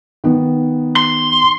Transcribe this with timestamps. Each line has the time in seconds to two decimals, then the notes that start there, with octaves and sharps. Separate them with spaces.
0.24 D#3 B3
0.96 C6